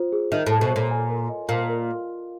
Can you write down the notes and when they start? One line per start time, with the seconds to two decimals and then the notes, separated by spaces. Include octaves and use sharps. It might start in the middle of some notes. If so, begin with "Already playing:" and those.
Already playing: F4 C5
0.12 G#4
0.32 D#3 E5
0.46 A2
0.52 A4
0.61 B2
0.71 C#5
0.76 A#2
0.91 G#5
1.10 A#4
1.29 D#5
1.49 A#2 F5
1.69 A#4